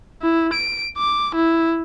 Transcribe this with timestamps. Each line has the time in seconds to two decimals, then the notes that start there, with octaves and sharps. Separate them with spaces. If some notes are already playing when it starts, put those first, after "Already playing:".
0.22 E4
0.53 D7
0.97 D6
1.35 E4